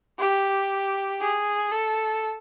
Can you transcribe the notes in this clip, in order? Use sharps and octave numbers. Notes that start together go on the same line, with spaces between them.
G4
G#4
A4